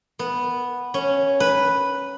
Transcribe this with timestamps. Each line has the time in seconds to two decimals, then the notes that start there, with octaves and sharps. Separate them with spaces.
0.19 B3
0.94 C#4
1.40 B4